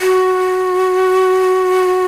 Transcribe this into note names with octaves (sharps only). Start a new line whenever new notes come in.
F#4